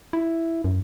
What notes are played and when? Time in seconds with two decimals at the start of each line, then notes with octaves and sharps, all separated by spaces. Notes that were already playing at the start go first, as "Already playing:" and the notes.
0.13 E4
0.64 F#2